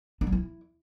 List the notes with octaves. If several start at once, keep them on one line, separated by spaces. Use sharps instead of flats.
D4
F#3
E4